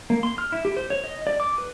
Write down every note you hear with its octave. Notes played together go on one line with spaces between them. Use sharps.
A#3
C6
F6
E4
G4
C5
C#5
D#5
D5
D6
B4